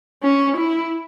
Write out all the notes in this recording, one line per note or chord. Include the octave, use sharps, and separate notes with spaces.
C#4
E4